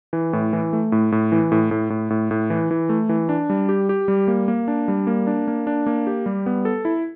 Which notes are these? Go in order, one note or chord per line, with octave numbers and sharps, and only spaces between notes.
E3
A2
E3
A3
A2
A2
E3
A2
A2
A2
A2
A2
E3
E3
A3
E3
D4
G3
G4
G4
G3
A#3
A#3
D4
G3
A#3
D4
A#3
D4
A#3
G4
G3
B3
A4
E4